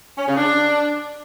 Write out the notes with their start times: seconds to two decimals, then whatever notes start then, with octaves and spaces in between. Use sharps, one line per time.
0.18 C#4
0.28 C#3
0.37 D4